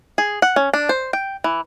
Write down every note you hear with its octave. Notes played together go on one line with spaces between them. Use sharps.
G#4
F#5
C#4
D4
C5
G5
E3